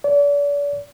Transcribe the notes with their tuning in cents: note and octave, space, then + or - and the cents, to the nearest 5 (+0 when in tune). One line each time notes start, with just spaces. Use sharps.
D5 -40